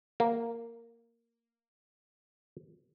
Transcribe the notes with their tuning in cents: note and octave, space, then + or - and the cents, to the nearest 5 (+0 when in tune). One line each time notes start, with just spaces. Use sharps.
A#3 -5